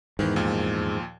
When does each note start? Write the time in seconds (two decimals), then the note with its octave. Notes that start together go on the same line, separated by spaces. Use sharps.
0.19 E2 G#2 D#3 E3 G#3
0.36 D#2 A#2 F3